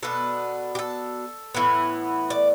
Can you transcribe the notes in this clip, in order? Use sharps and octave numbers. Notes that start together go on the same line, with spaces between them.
B2 B3 D4 A4
G4
A4
A2 E3 B3
D5